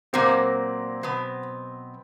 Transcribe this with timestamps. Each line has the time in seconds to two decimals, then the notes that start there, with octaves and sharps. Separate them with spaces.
0.13 A#2 F#3 A#3 C4
1.03 B2 F#3 B3